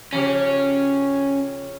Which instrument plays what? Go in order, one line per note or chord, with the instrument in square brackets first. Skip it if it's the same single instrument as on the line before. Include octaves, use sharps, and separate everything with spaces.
[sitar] C#3 F3 G4 [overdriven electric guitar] C#4